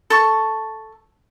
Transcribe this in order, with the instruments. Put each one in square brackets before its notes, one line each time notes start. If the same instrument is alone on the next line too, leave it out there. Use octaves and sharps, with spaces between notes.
[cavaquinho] A4 C#6